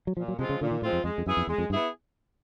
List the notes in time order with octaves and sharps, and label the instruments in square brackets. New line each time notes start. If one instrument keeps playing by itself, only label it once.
[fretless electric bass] F#3
[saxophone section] A#2 [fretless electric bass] F3
[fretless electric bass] F#3
[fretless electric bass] C3 [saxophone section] F3 G#3 C4 F4
[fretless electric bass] C#3
[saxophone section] A#2 [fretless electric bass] D3
[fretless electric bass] D#3
[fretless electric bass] A2 [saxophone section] F3 G#3 C4 F4
[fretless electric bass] F2
[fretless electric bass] F2 [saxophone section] G#3
[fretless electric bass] F2
[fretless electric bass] F#2 [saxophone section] B3 E4 G#4
[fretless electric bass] F2
[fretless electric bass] E2 [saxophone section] G#3
[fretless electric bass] F2
[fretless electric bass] G2 [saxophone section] B3 E4 G#4